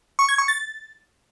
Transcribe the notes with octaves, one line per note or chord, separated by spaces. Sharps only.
C#6
G#6
C#6
A6